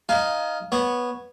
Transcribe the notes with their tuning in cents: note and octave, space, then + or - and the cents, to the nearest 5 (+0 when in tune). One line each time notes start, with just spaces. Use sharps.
D#4 +0 F5 +0 G#5 +35
B3 -10 C#5 +0